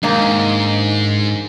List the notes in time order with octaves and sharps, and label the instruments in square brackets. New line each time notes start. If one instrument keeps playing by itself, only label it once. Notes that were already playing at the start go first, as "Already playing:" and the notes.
[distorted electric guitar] G#2 [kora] D#3 A#3 D#4 [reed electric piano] D4